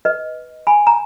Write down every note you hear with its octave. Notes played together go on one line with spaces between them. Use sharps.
B4 D#5
G#5 B5
A#5